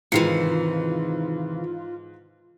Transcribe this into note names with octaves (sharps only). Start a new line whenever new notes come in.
G#2 C3 D#3 E3 F4 C7 C#7